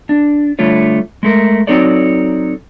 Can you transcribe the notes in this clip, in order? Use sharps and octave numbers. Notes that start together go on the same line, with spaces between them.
D4
D3 G3 A3 F4 C#5
G#3 A3 A#4
F#3 C4 D#4 A4 C#5 D5